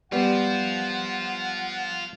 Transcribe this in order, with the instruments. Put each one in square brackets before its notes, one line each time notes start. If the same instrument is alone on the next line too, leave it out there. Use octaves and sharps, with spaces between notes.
[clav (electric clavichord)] G3 B3 [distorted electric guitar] F4 C5 [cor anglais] F#5